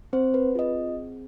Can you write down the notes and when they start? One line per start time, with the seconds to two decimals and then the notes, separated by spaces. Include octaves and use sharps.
0.13 C4 C5
0.34 B4
0.55 C4 F4 G#4 D#5